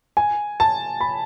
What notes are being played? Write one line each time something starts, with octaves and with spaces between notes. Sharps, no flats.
G#5
A5
B5